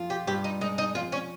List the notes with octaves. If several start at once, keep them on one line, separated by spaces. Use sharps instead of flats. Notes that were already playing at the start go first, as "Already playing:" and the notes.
Already playing: F2 F4
G4
G2 G4
D#4
G#3 D#4
D#4
F2 F4
C#4